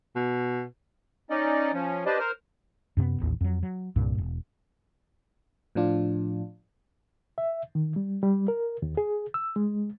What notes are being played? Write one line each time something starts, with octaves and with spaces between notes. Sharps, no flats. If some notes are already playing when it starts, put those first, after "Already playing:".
B2
C#4 D#4 D5 D#5
F3 C#4
D4 G4 B4 C5 D5 D#5
A#4 C5 F6
F#2 C3 A#3 B3
E1 A1 D#2
F2 F#3
F#3
C2 G2 A#2
E1
A2 F3 D4 F4
E5
D#3
G3
G3
A#4
D#2
G#4
E6
G#3